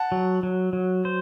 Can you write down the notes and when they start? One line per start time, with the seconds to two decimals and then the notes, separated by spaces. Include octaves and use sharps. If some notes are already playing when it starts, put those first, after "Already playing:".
Already playing: F#5 A5
0.12 F#3
0.43 F#3
0.73 F#3
1.05 C5